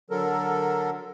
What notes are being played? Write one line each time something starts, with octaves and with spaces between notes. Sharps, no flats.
D3 F#3 A4 A#4